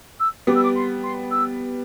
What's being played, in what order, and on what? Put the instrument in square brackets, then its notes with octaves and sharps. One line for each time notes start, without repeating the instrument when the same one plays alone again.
[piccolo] E6
[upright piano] G3 B3 [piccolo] D6
[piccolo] E6
D6
C6
C6
E6